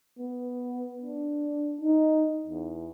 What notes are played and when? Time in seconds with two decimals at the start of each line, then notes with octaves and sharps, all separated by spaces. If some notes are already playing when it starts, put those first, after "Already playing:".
0.19 B3
1.01 D4
1.81 D#4
2.47 E2